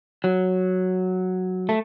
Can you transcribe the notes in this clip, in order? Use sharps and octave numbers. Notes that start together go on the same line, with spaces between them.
F#3
A3